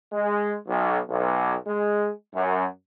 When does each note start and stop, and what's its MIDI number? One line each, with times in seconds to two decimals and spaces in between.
0.13 0.56 56
0.68 0.98 35
1.09 1.54 35
1.66 2.09 56
2.34 2.65 42